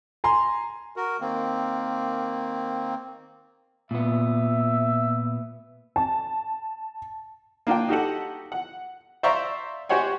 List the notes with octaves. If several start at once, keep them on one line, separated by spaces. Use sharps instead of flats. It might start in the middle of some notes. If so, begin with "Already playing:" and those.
G#5 A#5 C6
F#4 A#4
D#3 A#3 C4
A#2 B3 E5
A5
A#3 D4 F4 G5
D#4 F#4 G4 A4 F#5
F#5
C5 D5 E5 F5 A#5 C#6
F#4 G4 C5 C#5 F#5 G#5